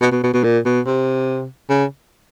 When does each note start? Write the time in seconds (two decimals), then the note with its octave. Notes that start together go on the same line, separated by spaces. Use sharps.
0.01 B2
0.12 B2
0.23 B2
0.33 B2
0.44 A#2
0.65 B2
0.86 C3
1.69 C#3